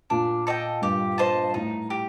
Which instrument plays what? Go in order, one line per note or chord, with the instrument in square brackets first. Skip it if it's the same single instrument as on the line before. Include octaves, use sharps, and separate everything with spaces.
[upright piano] A#2 [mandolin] D4
[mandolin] A4 D#5 G5
[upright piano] G2 [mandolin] G4
[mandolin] C5 D#5 A5
[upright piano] A2 [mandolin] D#4
[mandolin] G4